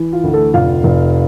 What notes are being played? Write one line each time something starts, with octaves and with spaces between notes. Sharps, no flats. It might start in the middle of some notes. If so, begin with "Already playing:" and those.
Already playing: E3
F4
D2
A3 A4
F1 F4 F5
F1